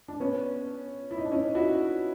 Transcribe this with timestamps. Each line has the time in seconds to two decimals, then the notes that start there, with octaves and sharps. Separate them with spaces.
0.08 D4
0.20 B3 C#4
1.11 E4
1.18 D#4
1.25 D4
1.32 C#4 D#4
1.55 E4 F#4